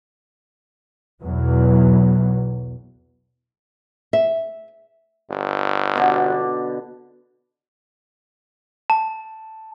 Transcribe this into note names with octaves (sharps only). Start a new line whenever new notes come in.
B1 E2 E3 F#3
E5
G1
B2 D3 D4
A5